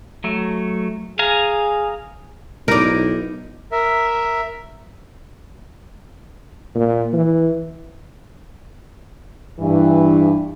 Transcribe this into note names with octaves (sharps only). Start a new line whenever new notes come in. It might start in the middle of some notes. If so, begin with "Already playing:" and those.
F#3 A3
G#4 F5 G#5 A#5
B1 D#4 E4 G4 A#4 D5
A#4 E5
A#2
E3
G2 E3